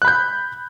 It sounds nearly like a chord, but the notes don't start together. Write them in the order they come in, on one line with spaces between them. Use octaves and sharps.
F#6 B5 G6